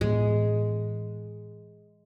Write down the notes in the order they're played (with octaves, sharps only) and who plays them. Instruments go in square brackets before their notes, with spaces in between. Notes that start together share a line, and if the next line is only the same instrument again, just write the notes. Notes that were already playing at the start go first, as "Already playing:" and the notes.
[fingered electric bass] A2 E3 B3 [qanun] G#3